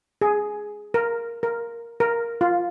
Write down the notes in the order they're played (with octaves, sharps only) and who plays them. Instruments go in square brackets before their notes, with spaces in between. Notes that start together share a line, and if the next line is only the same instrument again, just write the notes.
[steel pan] G#4
A#4
A#4
A#4
F4